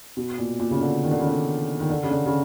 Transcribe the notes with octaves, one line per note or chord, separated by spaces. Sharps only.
B2
A#2
A#2
C#3
D3
D#3
D3
C#3
D3
D#3
D3
C#3
D3
C#3